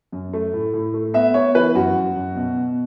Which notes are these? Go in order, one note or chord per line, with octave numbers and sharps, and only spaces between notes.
F#2
A3
A2
A2
A3
B3 E5
B3 C#5
E3 B4
F#2 F#4
F#2
F#2
B2
B2